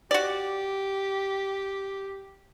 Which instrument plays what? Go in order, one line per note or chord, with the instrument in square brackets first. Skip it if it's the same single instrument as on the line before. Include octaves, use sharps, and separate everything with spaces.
[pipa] F#4 D5 [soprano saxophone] G4